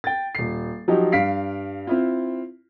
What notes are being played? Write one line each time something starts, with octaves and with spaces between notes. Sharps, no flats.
G5 A6
D#1 C7
F3 F#3 D#4 G4
G2 F5 B6 C7 D7
C4 E4 F4